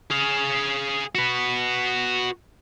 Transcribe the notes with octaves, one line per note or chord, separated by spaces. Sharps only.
G#4 F5
F#4 B4